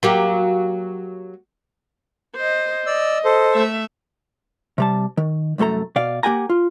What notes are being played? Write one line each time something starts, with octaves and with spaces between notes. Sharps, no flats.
F#3 A#3 G4
C5 D#5
D5 D#5 E6
A4 C5
A3 E5
C3 G3 A5
D#3
C2 F#2 A3 A4 A#5
B2 D5 F5
A#3 G4 F#5 G#5 A#5
F4